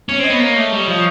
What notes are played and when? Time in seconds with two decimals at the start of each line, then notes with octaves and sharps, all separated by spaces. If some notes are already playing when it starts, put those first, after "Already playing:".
0.09 C#4 C#5
0.19 C4
0.24 D#5
0.30 B3
0.40 A#3 D#5
0.56 A3
0.72 G3
0.88 F3